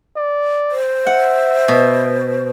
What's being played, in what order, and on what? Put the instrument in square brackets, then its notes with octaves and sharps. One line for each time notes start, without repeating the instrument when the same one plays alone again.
[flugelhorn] D5
[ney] C5
[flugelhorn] E5 [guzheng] F#5
[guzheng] B2